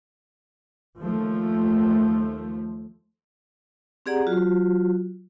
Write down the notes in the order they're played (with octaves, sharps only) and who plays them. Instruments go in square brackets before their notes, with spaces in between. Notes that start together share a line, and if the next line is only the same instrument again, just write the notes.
[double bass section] D#2 F3 A3
[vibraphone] C4 G4 G#4 D5 F#5 A#5
F#3 F4 F#4